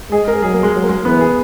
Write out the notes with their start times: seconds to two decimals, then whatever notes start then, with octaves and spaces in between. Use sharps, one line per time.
0.11 G#3 G#4
0.28 A#4
0.42 F#3 G#4
0.54 A#3
0.63 G#3
0.74 F#3
0.83 A#3
0.89 G#3
1.05 E3 B3
1.21 G#4